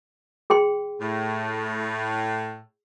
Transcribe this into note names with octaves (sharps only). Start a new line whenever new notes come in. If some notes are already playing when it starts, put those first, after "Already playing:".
G#4 G5 C6
A2